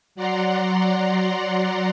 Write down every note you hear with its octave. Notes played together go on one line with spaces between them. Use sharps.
F#3 D5 F#5 A#5 C6